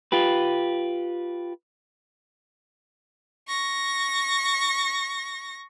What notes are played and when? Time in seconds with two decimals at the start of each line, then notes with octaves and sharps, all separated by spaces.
0.12 F4 G4 B4
3.47 C#6 A#6